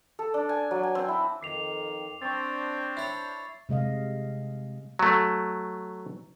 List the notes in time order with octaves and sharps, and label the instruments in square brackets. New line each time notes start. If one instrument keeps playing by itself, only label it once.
[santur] A4
D4
G#5
F#3
G#5
C4
E4
[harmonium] F2 D#3 [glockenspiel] D6 C7 F7
[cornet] C4 [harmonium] D4 C5 [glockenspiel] C#6 A6
[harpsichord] E4 C#5 [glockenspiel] A6 C7
[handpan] C3 G#3 D#5 F5
[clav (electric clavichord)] F#3 A3